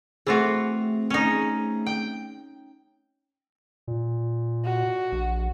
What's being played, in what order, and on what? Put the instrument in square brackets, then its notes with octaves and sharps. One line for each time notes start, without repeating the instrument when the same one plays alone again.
[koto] E3 F4 F#4 [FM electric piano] A3 C4 G#4
[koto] C#4 D#4
G5
[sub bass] A#2
[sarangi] F#4
[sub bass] A#1